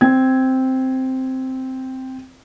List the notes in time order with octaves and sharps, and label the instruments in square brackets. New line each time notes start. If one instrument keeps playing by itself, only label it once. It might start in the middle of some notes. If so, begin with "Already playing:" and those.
[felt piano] C4 G#6